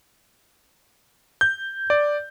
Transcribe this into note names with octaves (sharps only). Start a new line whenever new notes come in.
G6
D5